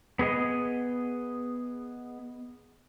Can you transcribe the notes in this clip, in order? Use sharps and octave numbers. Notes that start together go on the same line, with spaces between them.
B3 G#4 D#5